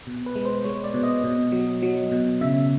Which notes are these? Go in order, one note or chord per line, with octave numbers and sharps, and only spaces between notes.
B2
B4
G#3
C5
G#3 C#5
D5
B2
D#5
B2
F#3
F#3
B2
C#3 E5